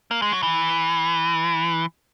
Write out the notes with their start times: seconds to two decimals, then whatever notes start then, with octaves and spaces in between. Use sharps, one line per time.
0.11 A#3
0.22 G#3
0.32 F#3
0.43 E3